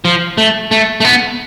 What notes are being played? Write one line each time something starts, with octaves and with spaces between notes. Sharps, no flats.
F3
A3
A3
A3
B3